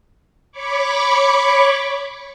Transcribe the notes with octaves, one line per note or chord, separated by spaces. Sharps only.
C#5 B5 C#6 D6